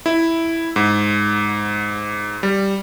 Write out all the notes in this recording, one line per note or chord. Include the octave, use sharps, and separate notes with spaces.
E4
G#2
G3